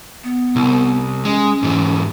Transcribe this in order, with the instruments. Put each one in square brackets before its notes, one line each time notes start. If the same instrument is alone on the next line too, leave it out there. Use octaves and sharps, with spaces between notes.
[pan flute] B3
[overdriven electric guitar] C2
[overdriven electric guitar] G#3 [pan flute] C#4
[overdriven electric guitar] G#2 E3